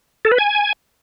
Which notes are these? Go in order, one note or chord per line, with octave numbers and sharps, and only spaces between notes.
A4
B4
G#5